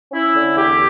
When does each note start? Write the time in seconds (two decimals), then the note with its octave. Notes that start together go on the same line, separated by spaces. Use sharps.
0.12 C#4 E4
0.35 D3
0.56 E2 G4